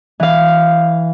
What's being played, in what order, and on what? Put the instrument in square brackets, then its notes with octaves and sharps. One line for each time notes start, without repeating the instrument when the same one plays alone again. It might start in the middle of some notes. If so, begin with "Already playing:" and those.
[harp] E3 F5